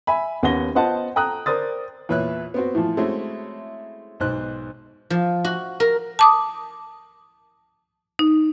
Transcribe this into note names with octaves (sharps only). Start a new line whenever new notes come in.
E5 G#5 B5
D#2 B3 C#4 F#5 A#6 G7
B3 F4 C5 D#5 F#5 A5
A4 G5 A#5 D#6 F#6
A#4 C5 D5 D#6 A6
E2 A#2 B4 C#5 E5 F#6
B3 C4 F#4
A2 E3 F3
G#3 A3 C4 C#4 E4 F#4
B1 G#2 C5 F#6
F3
F#4
A#4
A5 D6 D#6
D#4